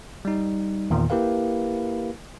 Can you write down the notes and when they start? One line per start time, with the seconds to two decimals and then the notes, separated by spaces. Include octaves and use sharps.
0.25 G3 D#4
0.90 E2 A#2 D#3
1.10 A#3 E4 G4 A#4 B4 F5